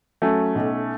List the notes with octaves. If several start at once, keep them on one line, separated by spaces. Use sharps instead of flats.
F#3 A3 C#4
B1